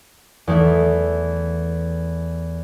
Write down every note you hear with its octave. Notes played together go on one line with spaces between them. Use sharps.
E2 A3 E4